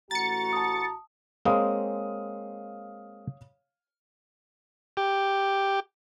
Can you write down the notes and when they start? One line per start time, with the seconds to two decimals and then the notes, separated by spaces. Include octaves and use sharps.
0.11 A1 A3 F#4 A#5 A6 C#7
0.53 A5 D#6
1.45 G#3 A#3 C4 C#5 F5 D#6
4.97 G4